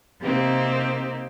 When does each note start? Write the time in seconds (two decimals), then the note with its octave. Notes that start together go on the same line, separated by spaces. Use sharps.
0.21 C3 A#3 C4 D#4 G4